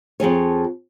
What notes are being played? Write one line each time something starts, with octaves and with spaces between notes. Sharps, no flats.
F2 F3 G#4 C#5